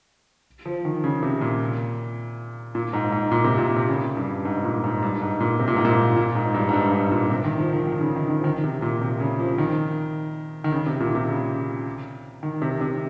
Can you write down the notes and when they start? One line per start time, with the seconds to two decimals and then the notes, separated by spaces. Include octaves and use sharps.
0.66 F3
0.85 D#3
1.04 C#3
1.23 C3
1.41 A#2
2.75 A#2
2.93 G#2
3.12 G#2
3.32 A#2
3.44 C3
3.58 A#2
3.76 C3
3.88 C#3
4.17 G2
4.45 G#2
4.64 A#2
4.84 G#2
5.02 G2
5.21 G#2
5.40 A#2
5.60 C3
5.68 A#2
5.76 G#2
5.85 A#2
6.16 A#2
6.35 G#2
6.54 G2
6.69 G#2
6.73 G2
6.92 G#2
7.11 A#2
7.30 C3
7.44 D#3
7.59 F3
7.73 D#3
7.87 D#3
8.01 C#3
8.16 D#3
8.30 D#3
8.38 F3
8.44 D#3
8.64 C3
8.82 A#2
9.01 C3
9.20 C#3
9.39 F3
9.58 D#3
10.64 D#3
10.72 C#3
10.86 C3
11.00 A#2
11.15 C3
11.29 C#3
12.43 D#3
12.62 C3
12.81 C3